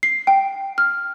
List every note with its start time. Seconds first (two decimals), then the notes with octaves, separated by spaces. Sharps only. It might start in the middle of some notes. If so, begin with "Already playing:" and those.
0.03 C7
0.27 G5
0.78 F6